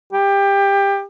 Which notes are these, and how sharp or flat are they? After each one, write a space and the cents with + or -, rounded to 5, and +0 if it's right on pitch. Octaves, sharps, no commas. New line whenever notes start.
G4 +20